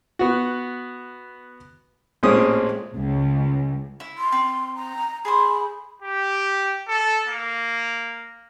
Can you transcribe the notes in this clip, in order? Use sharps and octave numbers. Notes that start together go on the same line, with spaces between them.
B3 F#4
A1 A#2 G#3 C4 C#4 D#6
C#2
E4
C6
C4
A#5
G#4 A4 C5 B5
G4
A4
A#3